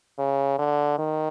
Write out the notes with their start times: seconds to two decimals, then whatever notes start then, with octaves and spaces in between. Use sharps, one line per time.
0.18 C#3
0.59 D3
0.99 D#3